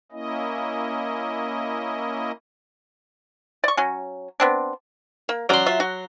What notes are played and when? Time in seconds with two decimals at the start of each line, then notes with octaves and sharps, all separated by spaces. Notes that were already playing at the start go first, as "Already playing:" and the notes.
0.12 A#3 C#4 E4 D#5
3.64 D5 C#6
3.77 F#3 C#4
4.40 B3 C4 D4
5.29 A#3
5.49 F#3 C#4 D5 C6
5.66 F4 E5
5.80 F#4